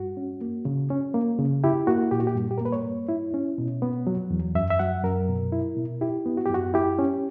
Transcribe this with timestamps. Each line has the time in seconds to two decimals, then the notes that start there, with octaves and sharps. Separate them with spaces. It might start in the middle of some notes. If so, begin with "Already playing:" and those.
Already playing: G2 F#4
0.17 C#4
0.41 A#3
0.65 C#3
0.90 C#4
1.14 A#3
1.38 C#3
1.64 E4 G4
1.87 A#3 F#4
2.11 A#2 G4
2.20 F#4
2.27 G4
2.36 G2
2.51 G4
2.58 A#4
2.61 A#3 B4
2.72 C#5
2.85 G2
3.09 E4
3.34 C#4
3.58 B2
3.82 B3
4.07 F#3
4.31 E2
4.55 F#2 E5
4.70 E5
4.79 F#3 F#5
5.04 F#2 A#4
5.28 B2
5.52 E4
5.77 B2
6.01 E4 G4
6.25 B3
6.37 F#4
6.46 G4
6.50 F#2 F#4
6.74 E4 G4
6.99 C#4